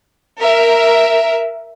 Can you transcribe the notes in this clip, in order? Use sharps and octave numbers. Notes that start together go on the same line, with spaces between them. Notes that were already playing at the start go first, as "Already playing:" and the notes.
A#4 E5